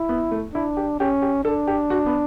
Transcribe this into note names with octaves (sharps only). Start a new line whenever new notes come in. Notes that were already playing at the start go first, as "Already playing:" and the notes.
Already playing: E4
B3
A3
D4 E4
G4
C#4 G4
G4
D4 A4
G4
F#4
B3